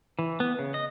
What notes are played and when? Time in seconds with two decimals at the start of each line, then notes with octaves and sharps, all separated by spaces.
0.19 E3
0.40 B3
0.59 C#3
0.74 D#5